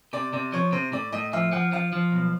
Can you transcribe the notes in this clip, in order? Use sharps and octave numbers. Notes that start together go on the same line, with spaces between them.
C3 D5
C3 D5
F3 C#5
C3 C5
A2 D5
A2 D#5
F3 E5
F3 F#5
F3 F5
F3
B1